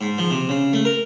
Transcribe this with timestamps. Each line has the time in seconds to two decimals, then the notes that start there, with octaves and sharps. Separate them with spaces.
0.01 G#2
0.18 F3
0.31 C3
0.49 C#3
0.73 A3
0.85 A#4